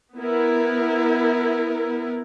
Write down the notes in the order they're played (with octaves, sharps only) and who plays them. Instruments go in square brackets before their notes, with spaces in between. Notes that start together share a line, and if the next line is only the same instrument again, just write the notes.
[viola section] B3 E4 A#4